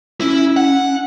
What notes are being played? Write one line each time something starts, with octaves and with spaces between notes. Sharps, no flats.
C#4 E4
F#5